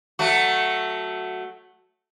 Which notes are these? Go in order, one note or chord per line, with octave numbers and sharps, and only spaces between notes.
F#3 A3 F#4